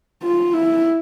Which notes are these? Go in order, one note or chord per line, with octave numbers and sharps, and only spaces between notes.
F4
E4